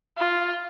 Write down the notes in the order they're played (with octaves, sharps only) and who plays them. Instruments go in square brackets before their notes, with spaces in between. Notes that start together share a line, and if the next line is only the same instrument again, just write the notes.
[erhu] F4